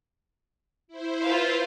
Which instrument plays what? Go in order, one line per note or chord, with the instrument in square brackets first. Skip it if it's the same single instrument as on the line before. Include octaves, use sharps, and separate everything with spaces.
[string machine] E4 C5
[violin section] F4 B4 F5